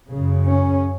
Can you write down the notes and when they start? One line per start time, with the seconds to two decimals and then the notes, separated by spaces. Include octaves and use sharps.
0.11 F#2 C#3
0.44 C#4